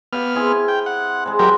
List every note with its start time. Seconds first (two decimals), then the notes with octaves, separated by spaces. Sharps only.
0.13 B3 G4 F5 F6
0.35 C4 E4 G#4
0.68 G5
0.86 F#5
1.26 C3 G#3
1.39 F#3 F#4 G4 A#4